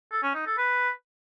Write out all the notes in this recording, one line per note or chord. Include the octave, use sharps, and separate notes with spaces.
A4
C#4
D#4
A4
B4